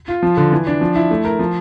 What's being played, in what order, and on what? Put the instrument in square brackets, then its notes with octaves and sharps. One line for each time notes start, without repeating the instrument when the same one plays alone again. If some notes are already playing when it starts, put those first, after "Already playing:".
[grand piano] F4
F3
D3
E3
D4
F3
E4
A3
A#4
F3